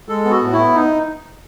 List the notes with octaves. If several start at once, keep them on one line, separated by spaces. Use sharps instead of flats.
G#3 A4
B3
F#4
A2
E4
B3
D#4